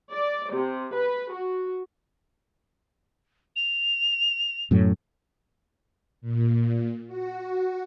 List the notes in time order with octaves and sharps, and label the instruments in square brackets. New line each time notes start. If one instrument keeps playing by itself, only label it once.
[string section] D5
C3
B4
F#4
[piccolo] F7
[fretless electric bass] F#2 A2 F#3
[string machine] A#2
F#4